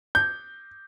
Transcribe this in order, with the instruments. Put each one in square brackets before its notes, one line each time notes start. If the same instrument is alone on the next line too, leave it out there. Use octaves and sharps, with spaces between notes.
[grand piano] G6